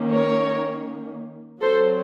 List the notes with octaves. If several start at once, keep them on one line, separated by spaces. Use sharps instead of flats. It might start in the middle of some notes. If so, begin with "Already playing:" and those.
Already playing: D#3 A#3 C#4
A#4 C#5
F#3 C4 A4 C5